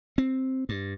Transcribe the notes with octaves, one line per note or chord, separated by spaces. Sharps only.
C4
G2